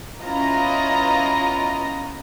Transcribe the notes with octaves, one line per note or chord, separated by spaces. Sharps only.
B3 C#4 E4 F4 D#5 A#5